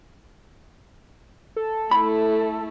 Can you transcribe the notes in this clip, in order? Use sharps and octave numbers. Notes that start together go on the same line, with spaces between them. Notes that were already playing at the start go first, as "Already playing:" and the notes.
A4
A3 E4 B5